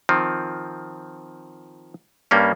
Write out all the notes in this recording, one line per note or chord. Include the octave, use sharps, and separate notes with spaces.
D#3 F3 C4
G2 G3 A#3 C#4